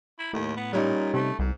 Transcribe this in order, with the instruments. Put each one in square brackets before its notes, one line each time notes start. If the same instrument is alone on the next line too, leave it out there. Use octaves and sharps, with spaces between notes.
[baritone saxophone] E4
[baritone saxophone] D#2 [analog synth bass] A2
[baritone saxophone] B3
[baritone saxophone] A#2 [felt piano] G3 C#4 D#4
[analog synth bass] C3 [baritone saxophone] A3
[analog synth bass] C2 [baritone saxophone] G#2